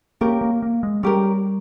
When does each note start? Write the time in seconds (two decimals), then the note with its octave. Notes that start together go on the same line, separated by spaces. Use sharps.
0.21 A#3 C#4 G4 A#4
0.41 A#3
0.62 A#3
0.83 G#3
1.03 G3 C#4 G4 A#4